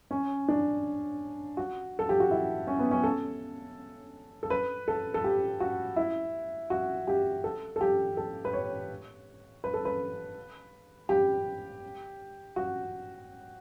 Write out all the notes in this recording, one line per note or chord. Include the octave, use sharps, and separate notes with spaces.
C#4
D4
F#4
A4
G4
F#4
E4
C#4
B3
C#4
A4
A4
B4
A4
A4
G4
F#4
E4
F#4
G4
A4
A4
G4
A4
B4
C#5
B4
A4
B4
G4
F#4